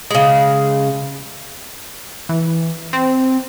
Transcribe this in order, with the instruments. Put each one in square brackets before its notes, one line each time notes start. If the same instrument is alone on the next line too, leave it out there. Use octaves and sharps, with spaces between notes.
[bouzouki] C#3 G#3
[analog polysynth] E3
C4